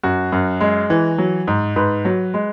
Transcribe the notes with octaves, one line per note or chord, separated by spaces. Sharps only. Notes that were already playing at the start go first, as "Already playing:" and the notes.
F#2 F#4
F#2
G#3
E3
F#3
G#2
G#2 B4
F#3
G#3